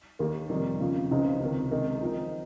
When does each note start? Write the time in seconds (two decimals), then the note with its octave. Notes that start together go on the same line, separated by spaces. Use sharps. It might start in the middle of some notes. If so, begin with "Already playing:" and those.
0.19 D#2 D#3 A#3
0.49 F2 C3 D#3 G3
0.80 C#3 F3 A#3
1.11 C#2 C#3 F3 C4 D#4
1.40 C#2 C3 D#3
1.71 C3 D#3 G#3 D#4
2.01 F3 C4 D#4